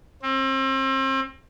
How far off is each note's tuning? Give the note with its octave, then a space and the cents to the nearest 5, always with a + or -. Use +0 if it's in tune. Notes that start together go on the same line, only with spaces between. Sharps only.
C4 +35